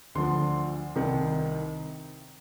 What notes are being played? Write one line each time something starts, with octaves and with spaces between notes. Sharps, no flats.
D2 D3 F3 C6
C2 C3 D#3